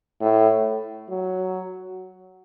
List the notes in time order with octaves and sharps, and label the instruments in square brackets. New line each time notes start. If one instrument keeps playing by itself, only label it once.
[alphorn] A2
F#3